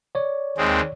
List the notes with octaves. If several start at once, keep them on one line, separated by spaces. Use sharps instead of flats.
C#5 D5
D#2 G#3 C4